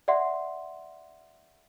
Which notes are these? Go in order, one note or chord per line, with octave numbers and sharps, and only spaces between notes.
D5 E5 F#5 C6